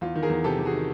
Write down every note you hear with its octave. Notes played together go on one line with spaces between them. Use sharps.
E2 F4
D#3
G#4 A#4
E2
C3 G4 A4
E2
F#4 G#4
D#3